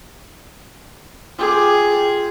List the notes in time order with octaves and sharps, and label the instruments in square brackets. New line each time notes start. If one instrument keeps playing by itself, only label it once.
[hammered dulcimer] F4 G4 [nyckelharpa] G#4